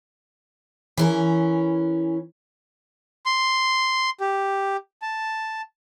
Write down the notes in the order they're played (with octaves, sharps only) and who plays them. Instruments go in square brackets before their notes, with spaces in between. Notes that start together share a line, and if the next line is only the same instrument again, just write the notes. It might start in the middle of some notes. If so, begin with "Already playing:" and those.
[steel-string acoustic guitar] E3 C#4 A#4
[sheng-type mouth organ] C6
G4
A5